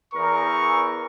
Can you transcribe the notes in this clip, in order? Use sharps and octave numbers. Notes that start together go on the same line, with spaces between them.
E2 A#4 C#6